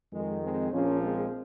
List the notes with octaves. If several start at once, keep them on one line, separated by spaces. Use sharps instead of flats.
F2 D#3 G#3
G#3 C4
A#1 A#2 F3 A#3 C#4
G#3 C4